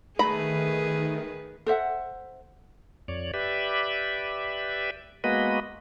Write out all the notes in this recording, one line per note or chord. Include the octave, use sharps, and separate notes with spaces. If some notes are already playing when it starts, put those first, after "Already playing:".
D#3 A3 G#4 B4 A#5 B5
A4 C5 E5 F#5
F2 C#5 D5
G4 B4 D5 E5
G#3 A#3 B3 F#4 B4 D#5